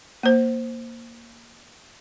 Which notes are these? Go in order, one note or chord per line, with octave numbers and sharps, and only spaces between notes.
A#3 C5